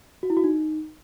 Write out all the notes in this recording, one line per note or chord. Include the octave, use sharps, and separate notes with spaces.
F#4
E4
F#4
D#4